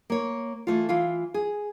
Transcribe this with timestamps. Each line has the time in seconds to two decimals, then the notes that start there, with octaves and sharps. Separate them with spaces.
0.10 A#3 C#5
0.67 E3 A3 F4
0.89 E3 F4 F5
1.34 G#4